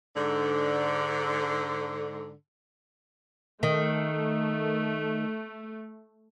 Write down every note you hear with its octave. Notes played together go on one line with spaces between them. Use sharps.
G#2 D3
D#3 A3